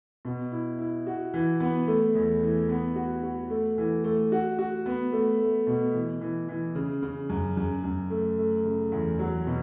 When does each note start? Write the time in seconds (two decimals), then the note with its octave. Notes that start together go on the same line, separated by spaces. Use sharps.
0.25 B2
0.52 E4
0.79 E4
1.07 F#4
1.34 E3
1.60 B3
1.87 A3
2.15 E2
2.42 E3
2.69 B3
2.96 F#4
3.23 F#4
3.50 A3
3.78 E3
4.04 A3
4.32 F#4
4.59 F#4
4.86 B3
5.12 A3
5.40 A3
5.67 B2
5.94 E3
6.21 E3
6.49 E3
6.75 C#3
7.02 C#3
7.29 F#2
7.57 F#2
7.83 F#2
8.10 A3
8.38 A3
8.64 C#3
8.92 E2
9.19 F#3
9.47 B2